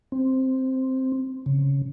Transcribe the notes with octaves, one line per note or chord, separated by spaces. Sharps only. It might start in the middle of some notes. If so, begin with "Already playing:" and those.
C4
C#3